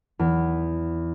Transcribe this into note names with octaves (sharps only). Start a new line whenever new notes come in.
E2